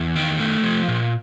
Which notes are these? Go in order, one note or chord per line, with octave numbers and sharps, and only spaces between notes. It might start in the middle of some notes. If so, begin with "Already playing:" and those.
Already playing: E2
D#3 G5
A3
F3
A#2